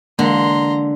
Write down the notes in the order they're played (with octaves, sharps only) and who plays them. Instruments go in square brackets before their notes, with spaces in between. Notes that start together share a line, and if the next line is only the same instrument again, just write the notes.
[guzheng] D3 [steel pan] E3 G#3 A#3 [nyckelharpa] A#5 C6